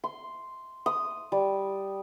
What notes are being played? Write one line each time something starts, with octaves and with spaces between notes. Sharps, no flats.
C6
D#6
G3